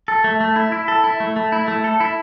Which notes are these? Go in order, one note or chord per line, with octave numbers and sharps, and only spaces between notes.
A4
A3
A3
E4
E4
A4
E4
A3
A3
E4
A3
A4
E4